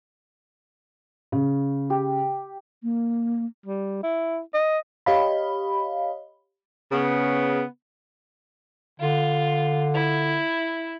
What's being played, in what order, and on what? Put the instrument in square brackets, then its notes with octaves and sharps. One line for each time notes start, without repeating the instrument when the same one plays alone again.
[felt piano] C#3
[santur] G4
[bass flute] A#3
[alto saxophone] G3
E4
D#5
[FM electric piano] G4 C#5 D#5 F5 B5
[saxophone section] C#3 B3
[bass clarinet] D3 [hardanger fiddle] F4
[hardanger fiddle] E4